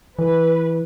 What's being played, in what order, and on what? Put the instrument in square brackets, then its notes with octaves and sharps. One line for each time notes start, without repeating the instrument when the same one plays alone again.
[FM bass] E3 [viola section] B4